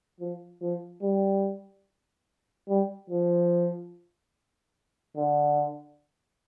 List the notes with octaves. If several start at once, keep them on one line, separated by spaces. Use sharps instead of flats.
F3
F3
G3
G3
F3
D3